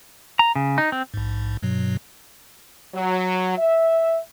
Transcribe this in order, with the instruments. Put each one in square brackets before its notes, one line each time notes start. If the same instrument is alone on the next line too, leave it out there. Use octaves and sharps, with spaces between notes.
[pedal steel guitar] A#5
C#3
D#4
C4
[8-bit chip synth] A#1 G#2
G2 B2 F#3
[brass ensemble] F#3
E5